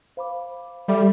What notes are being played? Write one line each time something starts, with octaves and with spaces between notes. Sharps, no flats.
C5 F5 B5 D6
G3 A4 E5 B5 D6